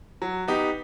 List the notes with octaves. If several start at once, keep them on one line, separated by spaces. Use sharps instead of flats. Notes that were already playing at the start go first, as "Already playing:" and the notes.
F#3
B3 D#4 G4